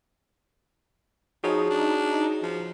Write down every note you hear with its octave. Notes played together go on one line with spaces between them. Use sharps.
F3 D#4 F#4 G#4 C#5
D4
F3